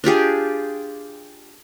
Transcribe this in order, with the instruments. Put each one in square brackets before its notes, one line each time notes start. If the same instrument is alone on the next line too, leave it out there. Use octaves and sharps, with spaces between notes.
[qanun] D4 F4 G4 G#4